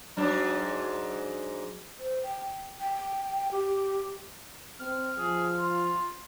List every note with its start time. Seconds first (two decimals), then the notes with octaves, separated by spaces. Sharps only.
0.17 G#2 F#3 D4
1.99 C5
2.23 G5
2.80 G5
3.52 G4
4.80 C4 F6
5.18 F3 G#4
5.58 F4